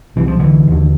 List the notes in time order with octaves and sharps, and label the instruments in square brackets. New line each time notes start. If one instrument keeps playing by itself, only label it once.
[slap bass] C2 C3 E3
F3
D3 E3
D#2 D3